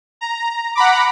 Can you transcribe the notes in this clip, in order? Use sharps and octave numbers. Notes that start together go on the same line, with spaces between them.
A#5
F#5 A#5 B5 D6